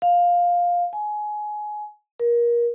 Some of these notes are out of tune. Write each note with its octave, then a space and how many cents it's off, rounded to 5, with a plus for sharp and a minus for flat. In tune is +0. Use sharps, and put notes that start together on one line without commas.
F5 +10
G#5 +20
A#4 +25